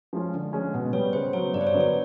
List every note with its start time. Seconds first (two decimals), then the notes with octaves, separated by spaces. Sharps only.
0.13 F3 G#3 C#4 F4
0.34 D3
0.53 F3 G#3 C#4
0.74 B2
0.93 G3 B3 C#5
1.13 C#3 C5
1.33 F#3 B3 C#5
1.53 G2 D5
1.61 C5
1.67 C#5
1.74 D3 F#3 B3
1.80 C#5